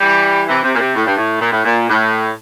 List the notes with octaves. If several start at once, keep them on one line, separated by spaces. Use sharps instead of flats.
E3 G3
C3 E3
C3
A#2
C3
A2
G2
A2
A#2
A2
A#2
A2